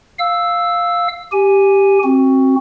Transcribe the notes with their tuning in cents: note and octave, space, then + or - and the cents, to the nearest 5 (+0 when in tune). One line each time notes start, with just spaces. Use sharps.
F5 +0 E6 +0
G4 +0 G#5 +0
C4 +25 F#4 +5